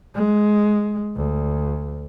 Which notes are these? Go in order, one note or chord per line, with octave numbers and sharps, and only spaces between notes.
G#3
D2